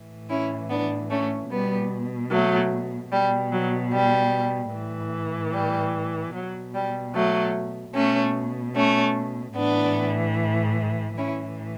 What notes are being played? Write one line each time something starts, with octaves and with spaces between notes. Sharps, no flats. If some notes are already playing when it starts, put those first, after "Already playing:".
Already playing: A2 E3
C#4 E4
B3 D4
A3 C#4
B2 G3 B3
F#3 A3
B2 G3
F#3
G3
A2 E3
G3
B2 F#3
G3
F#3 A3
B2 A3 C#4
A3 C#4
A2 E3 B3 D4
A2 E3 C#4 E4